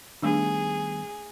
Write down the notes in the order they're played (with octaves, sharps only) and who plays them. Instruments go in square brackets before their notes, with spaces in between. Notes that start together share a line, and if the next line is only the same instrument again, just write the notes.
[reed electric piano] D#3 G3 B3 [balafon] A3 D4 [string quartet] G#4